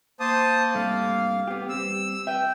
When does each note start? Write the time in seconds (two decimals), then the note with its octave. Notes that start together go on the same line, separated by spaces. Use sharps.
0.20 A#3 C5 A5 D#6
0.75 G2 C3 A3 F5
1.47 B3 G4
1.69 G3 C4 E6
2.27 B4 E5 G5